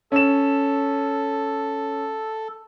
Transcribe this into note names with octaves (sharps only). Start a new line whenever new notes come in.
C#4 A4 E7